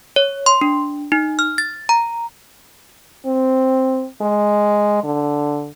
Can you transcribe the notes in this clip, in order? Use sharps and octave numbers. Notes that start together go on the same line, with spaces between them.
C#5
C6
D4
D#4
F6
A6
A#5
C4
G#3
D3